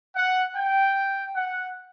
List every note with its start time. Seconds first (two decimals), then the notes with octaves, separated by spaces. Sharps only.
0.15 F#5
0.56 G5
1.36 F#5